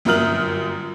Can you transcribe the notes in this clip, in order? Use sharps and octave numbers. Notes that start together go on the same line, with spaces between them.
G1 F#2 A#3 D#6 F6 F#7